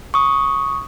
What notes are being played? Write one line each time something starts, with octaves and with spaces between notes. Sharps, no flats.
C#6 D#6